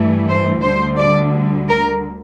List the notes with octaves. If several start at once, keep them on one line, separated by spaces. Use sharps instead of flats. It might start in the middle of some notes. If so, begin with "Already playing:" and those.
Already playing: G2 E3 A3
C5
D2 D3 G3 C5
D5
A#4